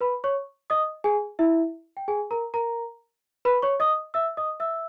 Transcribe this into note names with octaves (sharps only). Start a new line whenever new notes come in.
B4 B5
C#5 C#6
D#5 D#6
G#4 G#5
E4 E5
G5
G#4 G#5
A#4 A#5
A#4 A#5
B4 B5
C#5 C#6
D#5 D#6
E5 E6
D#5 D#6
E5 E6